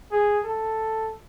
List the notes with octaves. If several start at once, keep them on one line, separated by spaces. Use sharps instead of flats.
G#4
A4